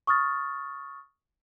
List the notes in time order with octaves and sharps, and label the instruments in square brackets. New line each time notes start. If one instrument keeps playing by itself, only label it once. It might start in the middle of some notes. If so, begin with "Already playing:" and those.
[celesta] C#6 D#6 F6 A6